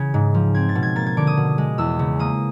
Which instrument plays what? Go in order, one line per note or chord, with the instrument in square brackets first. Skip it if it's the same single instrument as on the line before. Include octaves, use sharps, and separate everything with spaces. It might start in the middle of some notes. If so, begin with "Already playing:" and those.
Already playing: [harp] C#3 E3 G#6
G#2
F3
C4 G#6
A6
B2
G#6
A#3 A6
G#6
D3 D6
D#6
B2
G#3
E2 E6
C#3
A#3 D#6